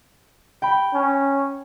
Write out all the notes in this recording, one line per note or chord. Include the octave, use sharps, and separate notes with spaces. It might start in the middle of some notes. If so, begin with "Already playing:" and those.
G5 B5
C#4